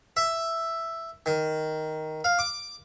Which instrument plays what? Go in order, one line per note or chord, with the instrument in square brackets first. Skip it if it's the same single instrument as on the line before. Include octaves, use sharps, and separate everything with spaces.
[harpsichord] E5
D#3
F5
D6